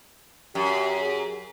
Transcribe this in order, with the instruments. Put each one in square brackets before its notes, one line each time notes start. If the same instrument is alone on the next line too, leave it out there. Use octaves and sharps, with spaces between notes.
[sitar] F#2 [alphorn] G4
[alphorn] G#4